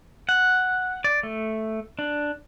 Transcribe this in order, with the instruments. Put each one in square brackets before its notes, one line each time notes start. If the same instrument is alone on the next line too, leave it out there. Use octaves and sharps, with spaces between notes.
[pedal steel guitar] F#5
D5
A3
D4